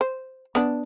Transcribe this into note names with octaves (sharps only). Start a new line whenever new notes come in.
C5
B3 D4